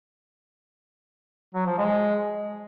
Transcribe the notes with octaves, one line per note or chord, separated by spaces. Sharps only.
F#3
F3
G#3